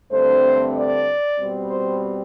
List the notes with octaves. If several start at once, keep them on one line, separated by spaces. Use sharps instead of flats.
G2 D3 A3 C4 C5
D5
B2 G3 C4
C5